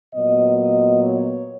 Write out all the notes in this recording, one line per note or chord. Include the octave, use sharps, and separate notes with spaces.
A#2 F#3 B3 D#5
D#5
C#5